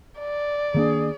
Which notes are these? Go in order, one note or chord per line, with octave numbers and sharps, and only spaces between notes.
D5
D#3 A#3 D4 G#4